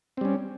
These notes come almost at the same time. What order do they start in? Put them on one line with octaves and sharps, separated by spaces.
C4 G3 C#4